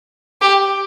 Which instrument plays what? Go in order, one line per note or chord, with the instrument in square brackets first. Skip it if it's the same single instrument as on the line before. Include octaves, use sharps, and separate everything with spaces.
[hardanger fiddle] G4